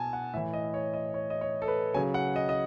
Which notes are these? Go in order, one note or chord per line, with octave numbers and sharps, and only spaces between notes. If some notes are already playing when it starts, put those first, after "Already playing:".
Already playing: B2 G#5 A5
F#5
A2 E3 E5
D#5
C#5
D#5
C#5
D#5
C#5
A4
B4
C#3 F#3 G#5
F#5
D#5
D#5